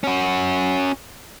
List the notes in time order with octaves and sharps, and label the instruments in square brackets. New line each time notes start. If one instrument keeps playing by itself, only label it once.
[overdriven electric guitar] C#4 F#4